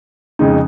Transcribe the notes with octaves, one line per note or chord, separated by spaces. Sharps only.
F2 C#3 G#3 D#4